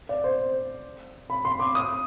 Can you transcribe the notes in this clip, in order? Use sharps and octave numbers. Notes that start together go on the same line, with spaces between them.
D5
C5
B5
C6
D6
D#6